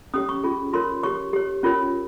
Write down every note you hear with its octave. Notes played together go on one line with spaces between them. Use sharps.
C#4 G4 C#5 D#6
C#6
C#4 F4 G#4
F4 A#4 C#5 C6
G4 C#5 C#6
G4 C#5
C#4 F4 A#4 C#5